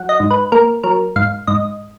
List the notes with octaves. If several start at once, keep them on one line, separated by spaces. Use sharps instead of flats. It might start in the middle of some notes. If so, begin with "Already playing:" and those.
Already playing: F#3 F#5
D#5
G#2
B4
A#3 A#4
F#3 A#4
G#2 F5
G#2 D#5